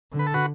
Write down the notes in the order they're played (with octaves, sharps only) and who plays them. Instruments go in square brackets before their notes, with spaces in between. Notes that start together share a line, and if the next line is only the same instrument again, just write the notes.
[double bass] D3
[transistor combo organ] B4
A4
F#4 B4